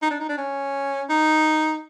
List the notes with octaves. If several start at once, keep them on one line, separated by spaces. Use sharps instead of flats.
D#4
D4
D#4
D4
C#4
D#4